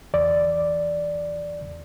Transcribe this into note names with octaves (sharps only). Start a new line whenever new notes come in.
E2 D5